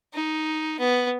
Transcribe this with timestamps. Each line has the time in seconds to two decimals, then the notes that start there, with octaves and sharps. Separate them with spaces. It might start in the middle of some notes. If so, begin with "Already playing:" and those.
0.14 D#4
0.80 B3